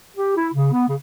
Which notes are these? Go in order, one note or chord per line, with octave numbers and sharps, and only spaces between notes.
G4
E4
C#3
B3
C#3